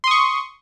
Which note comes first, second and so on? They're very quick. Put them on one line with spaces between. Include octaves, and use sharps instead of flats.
C6 D#6 C#6